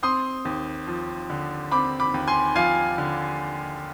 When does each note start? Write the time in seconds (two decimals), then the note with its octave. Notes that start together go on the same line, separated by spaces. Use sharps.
0.03 C4 C6 D#6
0.45 D#2
0.87 F3
1.30 D3
1.71 C4 B5 D6
2.00 B5 D6
2.14 D#2
2.28 G#5 C6
2.56 F3 F5 G#5
2.98 D3